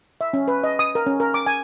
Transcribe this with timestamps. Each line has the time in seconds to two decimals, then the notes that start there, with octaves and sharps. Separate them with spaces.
0.21 E5
0.33 C#4
0.48 B4
0.63 D#5
0.79 D#6
0.95 A#4
1.06 C#4
1.20 A#4
1.34 D6
1.46 G#5